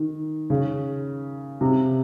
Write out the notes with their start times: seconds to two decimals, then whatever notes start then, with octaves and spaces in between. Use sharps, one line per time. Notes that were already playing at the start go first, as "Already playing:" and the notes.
Already playing: D#3
0.50 C#3
1.61 C3